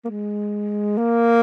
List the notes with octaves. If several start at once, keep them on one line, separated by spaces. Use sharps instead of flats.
A#3
G#3
A#3